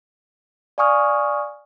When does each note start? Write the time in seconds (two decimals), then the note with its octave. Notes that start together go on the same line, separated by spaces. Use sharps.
0.78 D5 F5 G#5 C#6 D#6 F6